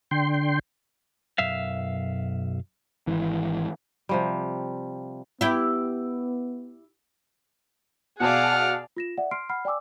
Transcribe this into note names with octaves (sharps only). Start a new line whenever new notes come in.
D3 G5 C6
B1 F#2 E5 F5
G#1 E3
C3 F3 G3
B3 E4 G4
B2 G#4 D5 F5 F#5 A5 F6
F4 A#6 E7
D5 E5 F#5
C6 F6 C7 D7
F#5 B5 F6 C7
D5 G5 G#5 D6 E6